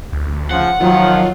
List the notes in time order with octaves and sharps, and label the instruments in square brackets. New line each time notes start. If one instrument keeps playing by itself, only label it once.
[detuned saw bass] D2
[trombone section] C#3 F3 [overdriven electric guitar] F#5
[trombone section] D#3 F3 [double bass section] F#3 [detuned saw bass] F4